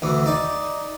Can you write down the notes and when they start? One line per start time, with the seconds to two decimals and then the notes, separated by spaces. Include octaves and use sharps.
0.02 D2 E3
0.26 D#4 D5